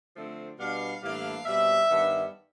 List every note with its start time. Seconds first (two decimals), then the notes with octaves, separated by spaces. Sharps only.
0.15 D3 F3 A3 C4
0.58 B2 G3 B3 D4 F5
1.02 A2 E3 G3 A#3 D4 F5
1.45 B2 G3 C4 E5
1.90 G2 D#3 G3 B3